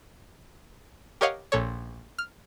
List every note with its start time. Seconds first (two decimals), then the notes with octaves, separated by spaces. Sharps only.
1.21 G4 A#4 C#5 D#5 F5 F#5
1.52 A#1 A#2 A4 C#5
2.18 F6